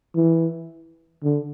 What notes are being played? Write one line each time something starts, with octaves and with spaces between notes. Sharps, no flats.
E3
D3